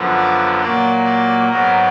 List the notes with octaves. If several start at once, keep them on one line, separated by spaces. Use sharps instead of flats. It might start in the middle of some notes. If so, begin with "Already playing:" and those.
Already playing: F#2 D3 F3 B3
D5
A#2 F#3 A#3 D5
D5
G#2 F#3 B3 A#4